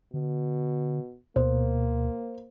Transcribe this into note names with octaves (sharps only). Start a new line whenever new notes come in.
B2 D3
D2 B2 A#3 C5